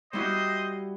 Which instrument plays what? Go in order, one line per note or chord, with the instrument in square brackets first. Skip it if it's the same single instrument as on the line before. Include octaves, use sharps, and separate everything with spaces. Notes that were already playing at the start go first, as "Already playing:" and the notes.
[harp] G3 E4 F#4 [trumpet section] C5 D#5